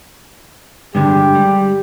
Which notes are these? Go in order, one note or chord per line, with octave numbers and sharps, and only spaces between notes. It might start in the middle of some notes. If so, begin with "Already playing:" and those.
G2 D3 G#3 G4
G3